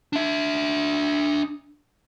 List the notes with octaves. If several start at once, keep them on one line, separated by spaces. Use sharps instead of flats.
D4 E5